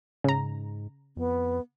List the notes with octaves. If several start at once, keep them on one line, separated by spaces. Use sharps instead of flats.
G#2 C#3 A#5
F2 B3